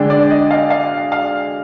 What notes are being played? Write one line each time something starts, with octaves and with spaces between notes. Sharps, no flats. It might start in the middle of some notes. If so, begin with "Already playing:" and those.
Already playing: D3 G#3 D4 G5
D5
D#5
F5
F5
F5